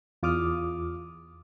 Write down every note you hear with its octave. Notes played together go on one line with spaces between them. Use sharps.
E2 F4 D6 D#6 F6